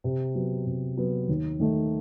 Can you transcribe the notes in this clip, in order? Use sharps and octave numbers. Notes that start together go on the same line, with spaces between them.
C3
F#3 B3
C3
F#3 B3
D#2
D#3 A3 D#4